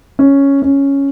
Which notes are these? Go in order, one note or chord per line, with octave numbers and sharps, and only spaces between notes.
C#4
C#4